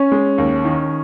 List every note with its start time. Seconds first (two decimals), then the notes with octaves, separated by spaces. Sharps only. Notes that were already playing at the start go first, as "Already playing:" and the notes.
Already playing: C#4
0.12 G#3
0.38 D#2
0.65 D#3